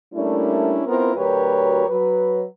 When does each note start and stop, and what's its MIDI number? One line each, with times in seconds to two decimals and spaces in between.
0.14 0.82 55
0.14 0.82 57
0.14 0.82 58
0.14 0.82 61
0.14 0.82 62
0.14 0.82 64
0.86 1.12 59
0.86 1.12 60
0.86 1.12 64
0.86 1.12 65
0.86 1.12 70
1.16 1.86 38
1.16 1.86 54
1.16 1.86 67
1.16 1.86 70
1.16 1.86 71
1.16 1.86 73
1.88 2.44 54
1.88 2.44 71